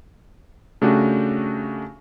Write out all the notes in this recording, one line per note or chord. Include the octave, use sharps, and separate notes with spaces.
C#3 A3 D4 F#4 G4